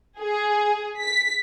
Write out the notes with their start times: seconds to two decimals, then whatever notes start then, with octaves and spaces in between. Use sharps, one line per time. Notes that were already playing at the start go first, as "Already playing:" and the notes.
0.19 G#4
1.00 B6